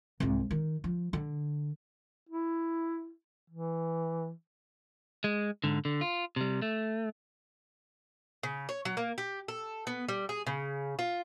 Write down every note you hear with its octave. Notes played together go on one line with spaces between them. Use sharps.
C2 G#2
D#3
F3
D3
E4
E3
G#3
G#2 D3
D3
F4
C3 G3
A3
C#3
C#5
F#3
A#3
G4
A4
B3
G3
G#4
C#3
F4